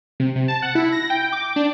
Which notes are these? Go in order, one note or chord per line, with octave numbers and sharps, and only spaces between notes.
C3
C3
A5
F#5
E4
A#6
G5
D6
D4